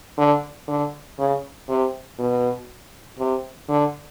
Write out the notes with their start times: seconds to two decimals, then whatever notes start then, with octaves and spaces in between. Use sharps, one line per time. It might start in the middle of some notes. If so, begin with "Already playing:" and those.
0.18 D3
0.68 D3
1.19 C#3
1.69 C3
2.19 B2
3.19 C3
3.69 D3